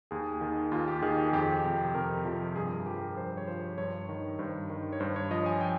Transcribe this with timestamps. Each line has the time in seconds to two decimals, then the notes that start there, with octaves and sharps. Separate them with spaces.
0.11 D#2 G#4
0.41 D#3
0.72 D#2 F4
0.88 G4
1.02 D#3 G#4
1.18 G4
1.29 G#4
1.33 F2 G4
1.64 C3 F3 G4
1.95 F2 A#4
2.25 C3 F3
2.56 G2 G#4
2.70 A#4
2.86 F3 G4
3.01 A#4
3.16 G2 C5
3.37 C#5
3.47 F3 C5
3.78 G2 C#5
4.09 D#3
4.39 G2 C5
4.70 D#3
4.92 C#5
5.00 G2 C5
5.16 C#5
5.31 F3 D#5
5.46 G#5
5.61 G5